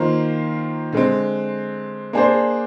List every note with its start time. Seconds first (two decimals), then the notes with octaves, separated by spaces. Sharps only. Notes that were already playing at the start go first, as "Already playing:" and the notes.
Already playing: D#3 A#3 F4 C5
0.93 D3 G#3 C4
2.13 A#3 D4 G#4 C5